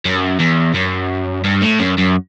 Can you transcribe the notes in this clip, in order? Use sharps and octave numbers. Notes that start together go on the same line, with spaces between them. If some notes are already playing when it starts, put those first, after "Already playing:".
F#2
E2
F#2
G2
A2
F#2
F#2